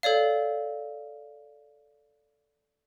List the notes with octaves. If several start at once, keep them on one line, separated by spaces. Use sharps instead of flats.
A4 C#5 D5 F5